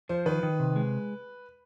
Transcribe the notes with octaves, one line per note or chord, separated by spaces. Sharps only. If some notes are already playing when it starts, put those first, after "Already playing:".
F3 C5
D#3 B4
D#3
C3
G#3